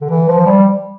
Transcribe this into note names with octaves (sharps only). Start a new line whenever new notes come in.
D3
E3
F3
F3
G3